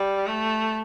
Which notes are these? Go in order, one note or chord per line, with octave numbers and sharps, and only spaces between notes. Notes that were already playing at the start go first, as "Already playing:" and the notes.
Already playing: G3
A3